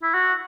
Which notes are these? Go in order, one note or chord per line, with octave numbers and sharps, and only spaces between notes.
E4
F#4